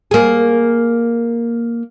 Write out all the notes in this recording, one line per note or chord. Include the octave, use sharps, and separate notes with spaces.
A#3 G#4